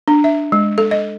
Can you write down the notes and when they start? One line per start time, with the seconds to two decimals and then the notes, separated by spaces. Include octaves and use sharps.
0.08 D4
0.24 E5
0.52 G#3
0.78 A4
0.91 D#5